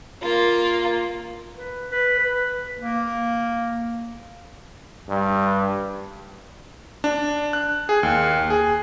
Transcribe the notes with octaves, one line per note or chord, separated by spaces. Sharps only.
A#3 F4
B4
B4
B4
A#3
G2
D4
F#6
G#4
D#2
G#4